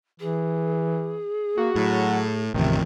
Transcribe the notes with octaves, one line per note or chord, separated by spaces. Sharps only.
E3 G#4
A#3 F#4
A2 F#3
A1 F2 C3 D#3